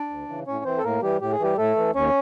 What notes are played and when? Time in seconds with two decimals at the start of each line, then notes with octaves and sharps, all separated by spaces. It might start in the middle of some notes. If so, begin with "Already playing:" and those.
Already playing: D4 D5
0.10 D2
0.29 C#3 E3
0.47 A2 C#4 C#5
0.65 E3 C4 C5
0.78 A4
0.84 A2 A#3 A#4
1.02 E3 G3 G4
1.21 A2 G4
1.32 G#4
1.39 E3 G3 G4
1.58 A2 A3 A4
1.76 E3
1.95 D#2 C#4 C#5